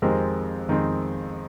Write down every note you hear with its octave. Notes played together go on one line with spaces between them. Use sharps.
F2 D#3 G#3 C4 G4 A#4
F2 D#3 G#3 C4